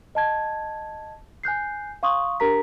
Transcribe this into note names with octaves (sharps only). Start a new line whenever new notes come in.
D#5 A5 G#6
G#5 F#6 G6 C7
F5 C6 C#6 D#6
D4 G4 A#4 A#5 B6